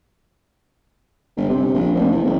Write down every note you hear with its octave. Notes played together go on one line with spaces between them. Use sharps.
G1
C3
A#1
F1
E2
F#1